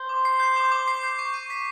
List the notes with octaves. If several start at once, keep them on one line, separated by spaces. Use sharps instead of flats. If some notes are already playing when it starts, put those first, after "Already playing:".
Already playing: C5
D6
C7
G6
D6
D6
C7
G6
C#6
D#7
B6